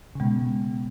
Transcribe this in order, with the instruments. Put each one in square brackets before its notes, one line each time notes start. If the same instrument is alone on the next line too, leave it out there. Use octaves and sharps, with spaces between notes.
[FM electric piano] C#3
[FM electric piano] B2 [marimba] G#3 B3